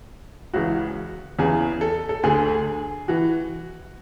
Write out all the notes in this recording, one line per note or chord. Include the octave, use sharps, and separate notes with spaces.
C#2 C#3 E3 F#4
E2 C#3 E3 G#4
A4
A4
D2 D3 G#4
E3 F#4